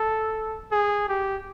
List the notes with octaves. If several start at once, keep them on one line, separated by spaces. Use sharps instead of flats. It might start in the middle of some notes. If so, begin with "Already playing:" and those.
Already playing: A4
G#4
G4